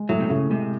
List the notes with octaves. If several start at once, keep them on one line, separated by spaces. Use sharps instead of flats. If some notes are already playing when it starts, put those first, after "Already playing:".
Already playing: G#3
A2 F#3
C3
A2 C#3
C3 G#3